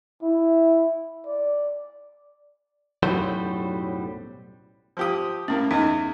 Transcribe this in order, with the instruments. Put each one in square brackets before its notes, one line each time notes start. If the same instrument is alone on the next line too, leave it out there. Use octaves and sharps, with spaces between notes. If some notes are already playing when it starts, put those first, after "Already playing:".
[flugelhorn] E4
D5
[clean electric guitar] B1 F#2 A2 F#3 G3 C5
[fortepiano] F3 G4 D#6
[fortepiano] A2 A#3 [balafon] C#4
[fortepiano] E2 [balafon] D#4 D#5